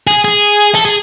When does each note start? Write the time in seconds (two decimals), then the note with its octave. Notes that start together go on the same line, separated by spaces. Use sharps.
0.07 G#4
0.25 G#4
0.75 A4
0.85 G#4